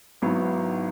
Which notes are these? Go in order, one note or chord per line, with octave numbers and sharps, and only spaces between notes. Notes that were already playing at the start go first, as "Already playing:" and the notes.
G#1 G#2 F#3 B3 E4